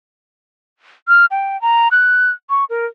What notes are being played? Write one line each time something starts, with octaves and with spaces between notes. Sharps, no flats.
F6
G5
A#5
F#6
C#6
A#4